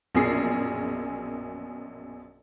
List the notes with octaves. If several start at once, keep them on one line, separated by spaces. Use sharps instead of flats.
A#1 F#2 B2 A#3 G#4 C7